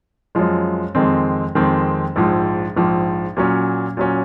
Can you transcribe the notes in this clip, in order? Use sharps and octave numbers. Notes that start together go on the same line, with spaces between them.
F#2 F3 G#3
F2 D#3 G#3 C4
F2 D#3 G#3 C4
A#1 G#2 F3
A#1 G#2 F3
A#2 F#3 C#4
A#2 F#3 C#4